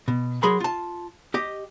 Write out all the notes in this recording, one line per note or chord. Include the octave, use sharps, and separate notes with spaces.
B2
F#3 G#4 A#4 B5 C6
F4 A5
G4 D#5